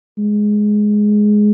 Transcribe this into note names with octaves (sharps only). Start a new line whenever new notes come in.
G#3